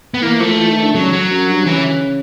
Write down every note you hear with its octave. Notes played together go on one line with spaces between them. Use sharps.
B3
E3 A#3
F3 A3
E3
D#3
D3
C#3 F#3
F#3
F#2
G2
C#3 E3